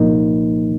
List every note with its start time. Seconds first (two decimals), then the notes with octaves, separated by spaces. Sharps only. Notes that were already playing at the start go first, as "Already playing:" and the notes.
Already playing: C2 A#2 F3 A#3 D#4